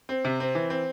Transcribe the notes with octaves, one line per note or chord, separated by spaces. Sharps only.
C4
C3
C4
E3
C4